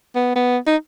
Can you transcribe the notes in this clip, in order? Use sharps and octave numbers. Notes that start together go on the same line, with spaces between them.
B3
B3
D#4